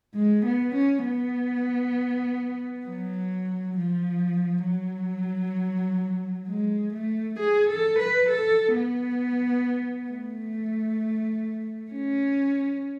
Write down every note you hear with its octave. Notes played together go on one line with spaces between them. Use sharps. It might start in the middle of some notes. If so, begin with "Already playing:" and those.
G#3
B3
C#4
B3
F#3
F3
F#3
G#3
A3
G#4
A4
B4
A4
B3
A3
C#4